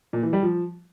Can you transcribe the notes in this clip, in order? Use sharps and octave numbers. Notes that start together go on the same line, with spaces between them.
A#2
E3
G3
F3